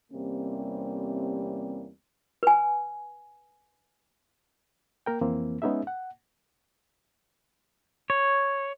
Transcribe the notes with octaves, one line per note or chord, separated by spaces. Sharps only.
E2 C3 G3 A#3 C4 C#4
B4 G#5
A#3 A#4 G5
F2 E3 A#3 C4
G#3 B3 C#4 D#4 G#4 E5
F#5
C#5